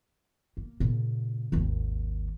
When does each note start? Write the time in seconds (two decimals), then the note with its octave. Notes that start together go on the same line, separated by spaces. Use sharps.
0.57 A#3
0.80 A#2 C#3
1.52 G#1 D#2